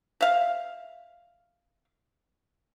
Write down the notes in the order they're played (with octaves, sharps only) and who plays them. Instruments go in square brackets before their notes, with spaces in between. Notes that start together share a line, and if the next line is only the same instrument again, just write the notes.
[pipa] E5 F5